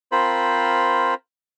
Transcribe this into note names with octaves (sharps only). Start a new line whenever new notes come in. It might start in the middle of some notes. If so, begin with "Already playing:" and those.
C4 F4 A#4 C5 B5